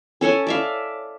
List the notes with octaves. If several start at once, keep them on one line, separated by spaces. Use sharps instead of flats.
C#4 A4 C#5 G#5
D5 E5 F5